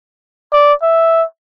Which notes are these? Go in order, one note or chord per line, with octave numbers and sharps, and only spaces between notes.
D5
E5